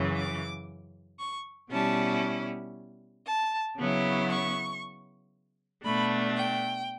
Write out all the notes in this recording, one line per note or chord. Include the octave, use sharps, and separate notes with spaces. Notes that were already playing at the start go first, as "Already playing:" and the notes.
Already playing: F#2 C#3 E3
D6
C#6
B2 G3 C#4 E4 A5
A5
C#3 F#3 B3 E4
C#6
B2 A3 D4 B5
G5